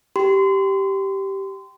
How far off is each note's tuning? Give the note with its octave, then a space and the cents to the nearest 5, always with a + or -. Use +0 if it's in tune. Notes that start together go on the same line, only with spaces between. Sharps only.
G4 -10 C6 -30